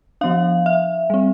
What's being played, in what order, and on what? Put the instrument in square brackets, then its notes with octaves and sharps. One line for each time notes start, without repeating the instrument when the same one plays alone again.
[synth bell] F3 B3 D4 F5
E5
G3 C4